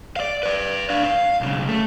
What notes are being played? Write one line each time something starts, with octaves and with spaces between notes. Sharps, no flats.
D5 F5
B4 D5
D4 F5
F5
B1 C#3
A3